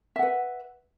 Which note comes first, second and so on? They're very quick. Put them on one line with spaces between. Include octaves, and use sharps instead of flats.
E5 F#5 B4